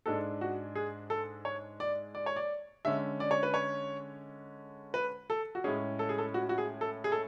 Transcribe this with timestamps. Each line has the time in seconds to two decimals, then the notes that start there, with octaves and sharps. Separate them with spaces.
0.06 G#2 G#3 D4 A4
0.41 F#4
0.75 G#4
1.10 A4
1.45 C#5
1.80 D5
2.15 D5
2.26 C#5
2.36 D5
2.85 D3 G#3 C#4 E5
3.20 D5
3.31 C#5
3.43 B4
3.54 C#5
4.94 B4
5.30 A4
5.55 F#4
5.64 A2 G#3 C#4 G#4
5.99 A4
6.09 G#4
6.18 A4
6.34 F#4
6.49 F#4
6.58 G#4
6.81 A4
7.04 G#4
7.12 A4